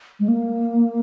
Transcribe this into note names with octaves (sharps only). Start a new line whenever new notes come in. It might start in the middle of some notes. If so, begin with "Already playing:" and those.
G#3
A#3